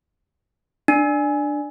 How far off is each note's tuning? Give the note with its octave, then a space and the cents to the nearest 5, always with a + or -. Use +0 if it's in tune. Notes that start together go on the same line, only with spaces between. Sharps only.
D4 +10